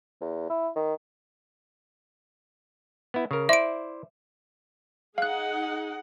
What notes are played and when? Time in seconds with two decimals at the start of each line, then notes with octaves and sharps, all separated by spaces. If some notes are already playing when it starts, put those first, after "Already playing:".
0.21 E2
0.50 E4
0.76 D#3
3.14 B3 E4
3.31 C#3 A#4
3.49 E4 C5 D5 E5 D7
5.18 D#4 G#4 F5 F#5 F#6